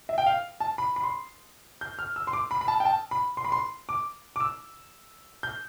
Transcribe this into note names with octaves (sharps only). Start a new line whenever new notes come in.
E5
G5
F5
A5
B5
B5
C6
G6
F6
E6
C6
D6
B5
B5
A5
G5
A5
B5
C6
B5
C6
D6
D6
E6
G6